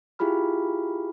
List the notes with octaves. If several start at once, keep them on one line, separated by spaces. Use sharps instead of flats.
E4 F4 G4 G#4 B5 F6